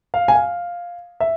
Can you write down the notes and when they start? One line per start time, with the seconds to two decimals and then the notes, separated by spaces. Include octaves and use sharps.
0.14 F5
0.28 G#5
0.35 F5
1.20 E5